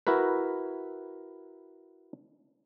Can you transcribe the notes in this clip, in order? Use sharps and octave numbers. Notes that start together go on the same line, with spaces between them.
E4 F#4 A#4 B4